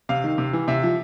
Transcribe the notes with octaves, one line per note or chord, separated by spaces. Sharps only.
C3 F5
D#3
C3
E3
C3 E5
F3